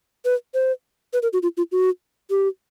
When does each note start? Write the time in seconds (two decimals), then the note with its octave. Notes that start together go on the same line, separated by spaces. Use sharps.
0.25 B4
0.54 C5
1.13 B4
1.23 A#4
1.33 F#4
1.43 F4
1.57 F4
1.72 F#4
2.30 G4